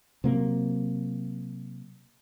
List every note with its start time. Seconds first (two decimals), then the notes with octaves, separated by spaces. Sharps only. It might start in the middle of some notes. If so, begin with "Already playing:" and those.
0.24 C3 F#3 A#3